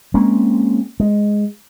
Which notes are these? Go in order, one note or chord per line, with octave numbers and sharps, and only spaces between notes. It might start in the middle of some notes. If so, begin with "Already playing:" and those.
G#3 A#3 C4 C#4
G#3